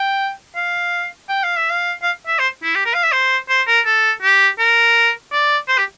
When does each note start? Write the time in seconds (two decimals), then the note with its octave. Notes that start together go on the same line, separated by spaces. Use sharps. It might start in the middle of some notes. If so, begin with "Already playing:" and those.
Already playing: G5
0.56 F5
1.29 G5
1.44 F5
1.57 E5
1.70 F5
2.03 F5
2.27 E5
2.39 C5
2.64 E4
2.75 G4
2.86 A#4
2.94 F5
3.04 E5
3.12 C5
3.49 C5
3.68 A#4
3.86 A4
4.22 G4
4.59 A#4
5.32 D5
5.68 C5
5.78 G4